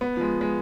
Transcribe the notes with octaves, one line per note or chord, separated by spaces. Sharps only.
B3
F3
G#3
G#3